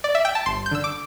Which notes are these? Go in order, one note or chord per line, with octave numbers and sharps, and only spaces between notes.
D5
E5
G5
A5
G1 C6
G6
D3 E6
D6